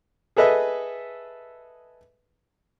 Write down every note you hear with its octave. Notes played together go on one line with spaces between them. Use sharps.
G#4 A4 B4 D#5 E5